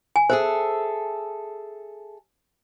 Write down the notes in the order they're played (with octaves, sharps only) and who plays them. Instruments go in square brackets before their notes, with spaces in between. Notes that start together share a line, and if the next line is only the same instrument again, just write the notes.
[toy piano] G#5
[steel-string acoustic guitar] G#4 A4 E5 [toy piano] C5